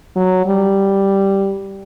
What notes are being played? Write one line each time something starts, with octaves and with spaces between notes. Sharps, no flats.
F#3
G3